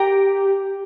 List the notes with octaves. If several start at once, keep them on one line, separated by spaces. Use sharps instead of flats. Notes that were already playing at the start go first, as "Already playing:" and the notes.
Already playing: G4 A#4 G5 A#5